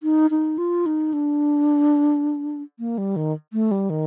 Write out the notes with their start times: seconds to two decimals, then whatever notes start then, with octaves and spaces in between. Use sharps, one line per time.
0.03 D#4
0.31 D#4
0.58 F4
0.86 D#4
1.13 D4
2.79 A#3
2.98 G3
3.16 D#3
3.53 A3
3.71 G3
3.90 D#3